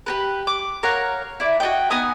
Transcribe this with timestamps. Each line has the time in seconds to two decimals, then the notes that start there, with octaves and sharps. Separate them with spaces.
0.06 G4 A#4 B4
0.47 D6
0.83 A#4 C#5 F5 F#5
1.40 E4 D5
1.60 F#4 A4 D#5 G5
1.90 B3 D#4 G#5 D#6